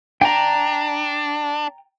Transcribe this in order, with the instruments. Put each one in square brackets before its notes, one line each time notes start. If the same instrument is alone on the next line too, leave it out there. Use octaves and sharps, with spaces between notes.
[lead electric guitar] D4 [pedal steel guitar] G5 A#5